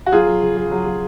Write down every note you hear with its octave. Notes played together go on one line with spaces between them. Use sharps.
F#4
F#3 F4 G#4
F#3
C#3
C#3
F#3
F#3